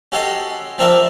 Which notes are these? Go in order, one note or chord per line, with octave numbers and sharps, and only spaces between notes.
C#4 F#4 G4 A4 D#5 C6
F3 C4 D4 A#4 E5 F5